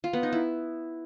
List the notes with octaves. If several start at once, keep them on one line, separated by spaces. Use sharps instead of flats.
F4
B3
D#4
E4